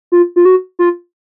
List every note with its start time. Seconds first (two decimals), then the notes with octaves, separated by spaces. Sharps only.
0.12 F4
0.36 F4
0.45 F#4
0.79 F4